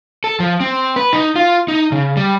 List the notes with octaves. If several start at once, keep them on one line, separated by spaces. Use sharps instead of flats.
A4
F3
C4
B4
D#4
F4
D#4
C#3
G3